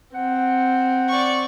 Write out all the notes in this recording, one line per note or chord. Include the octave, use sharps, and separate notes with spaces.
C4 F#5
D5 C#6